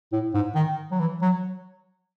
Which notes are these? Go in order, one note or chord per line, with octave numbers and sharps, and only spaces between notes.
A2
G#2
D#3
F#3
E3
F#3